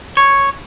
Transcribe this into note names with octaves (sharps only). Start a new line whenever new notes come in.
C#5